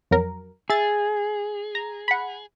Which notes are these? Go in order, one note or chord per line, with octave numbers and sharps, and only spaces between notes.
F2 F#3 A#4
G#4 E5 A6
A#5
F#5 B5